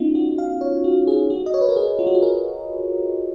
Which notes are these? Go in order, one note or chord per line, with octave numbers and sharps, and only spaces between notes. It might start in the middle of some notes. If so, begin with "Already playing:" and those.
Already playing: B3 C#4 D#4 F4
F#4
F5
C#5
F#4
G#4
F#4
D#5
C#5
B4
A#4
G#4
F4
F#4
G#4
A#4